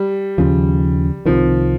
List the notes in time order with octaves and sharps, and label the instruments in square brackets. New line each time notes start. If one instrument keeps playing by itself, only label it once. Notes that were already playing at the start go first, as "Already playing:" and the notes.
Already playing: [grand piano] G3
[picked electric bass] D#2 C#3 F3
[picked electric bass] C2 C3 D#3 [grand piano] F3